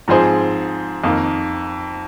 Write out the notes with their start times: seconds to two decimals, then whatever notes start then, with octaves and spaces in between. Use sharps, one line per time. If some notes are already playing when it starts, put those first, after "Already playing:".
0.08 G#2 F3 C4 G#4 C5
1.04 F2 D#3 A#3